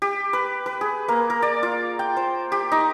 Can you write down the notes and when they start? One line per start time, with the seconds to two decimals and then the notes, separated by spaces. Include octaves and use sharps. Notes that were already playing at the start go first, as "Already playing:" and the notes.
0.02 G4
0.33 B4
0.66 B4
0.81 G#4
1.08 A#3
1.30 A#4
1.42 D5
1.63 F4
1.99 G5
2.17 C5
2.52 G4
2.72 D#4